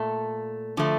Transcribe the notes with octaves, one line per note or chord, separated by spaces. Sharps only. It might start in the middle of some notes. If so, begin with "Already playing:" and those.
Already playing: A#2 A3
D3 F3 A3